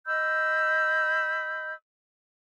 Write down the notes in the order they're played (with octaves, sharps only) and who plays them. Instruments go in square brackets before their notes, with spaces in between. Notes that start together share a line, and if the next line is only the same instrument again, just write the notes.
[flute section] D#5 B5 E6 G6